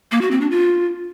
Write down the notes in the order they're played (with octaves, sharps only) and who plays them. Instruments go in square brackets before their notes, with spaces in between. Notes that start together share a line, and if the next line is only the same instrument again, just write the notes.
[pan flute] A#3
F#4
C4
D4
F4